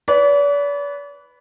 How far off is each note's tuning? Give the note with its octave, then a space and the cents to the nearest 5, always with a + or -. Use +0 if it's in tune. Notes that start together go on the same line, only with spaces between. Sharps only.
B4 +0 D5 -40